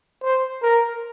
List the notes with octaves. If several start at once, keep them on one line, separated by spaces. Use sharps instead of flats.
C5
A#4